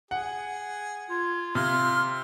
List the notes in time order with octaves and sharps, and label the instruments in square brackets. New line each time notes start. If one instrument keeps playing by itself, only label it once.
[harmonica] G#4 [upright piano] F#5
[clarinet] F4 [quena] G#6
[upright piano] C3 [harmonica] F5 C6 [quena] F6